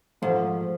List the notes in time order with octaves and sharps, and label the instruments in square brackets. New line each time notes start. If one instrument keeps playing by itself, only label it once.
[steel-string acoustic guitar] G#2 [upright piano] F3 A3